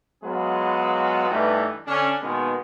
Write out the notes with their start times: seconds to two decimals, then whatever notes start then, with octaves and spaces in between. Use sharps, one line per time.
0.24 F#3 G#3 B3 F4 G#4 B4
1.29 G2 E3 G3 A3 B3 D#4
1.87 D3 C#4 D4
2.22 B2 D#3 G#3 A#3 B3